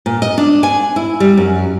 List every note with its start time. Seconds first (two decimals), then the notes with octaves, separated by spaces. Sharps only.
0.06 A#2
0.22 D#5
0.38 D4
0.63 G#5
0.96 E4
1.20 G3
1.37 F#2